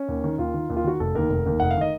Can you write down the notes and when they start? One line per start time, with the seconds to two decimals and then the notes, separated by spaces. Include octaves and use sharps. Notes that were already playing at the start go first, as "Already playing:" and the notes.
Already playing: C#4
0.08 D#2
0.24 D#3
0.38 D#2 F4
0.54 D#3
0.70 D#2
0.77 F4
0.84 D#3 F#4
1.00 F1 A4
1.15 D#2 D#3 A#4
1.29 F1
1.46 D#2 D#3
1.60 F1 F#5
1.71 F5
1.77 D#3 D#5